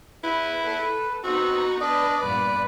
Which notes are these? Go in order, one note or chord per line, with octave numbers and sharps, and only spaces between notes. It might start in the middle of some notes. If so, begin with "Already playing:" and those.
E4 B4
A4 B4
B3 C4 D#4 F#4
D4 B4 D5 D#5
G2 A#2 B3 B4